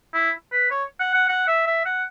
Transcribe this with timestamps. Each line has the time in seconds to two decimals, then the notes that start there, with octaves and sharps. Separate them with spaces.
0.14 E4
0.52 B4
0.71 C#5
1.00 F#5
1.14 F#5
1.28 F#5
1.48 E5
1.66 E5
1.85 F#5